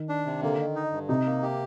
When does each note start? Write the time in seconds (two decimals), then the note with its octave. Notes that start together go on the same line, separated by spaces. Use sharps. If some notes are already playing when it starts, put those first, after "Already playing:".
Already playing: D#3
0.09 D4
0.26 C3
0.42 D3 A#3
0.59 D#3
0.75 D#4
0.92 G2
1.08 C3 D#4
1.26 A#3
1.43 G4